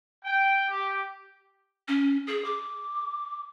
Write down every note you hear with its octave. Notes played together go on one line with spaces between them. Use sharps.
G5
G4
C#4
G#4
D6